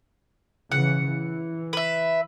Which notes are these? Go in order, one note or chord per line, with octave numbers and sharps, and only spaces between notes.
C#3 E3 F#5
E3
B4 E5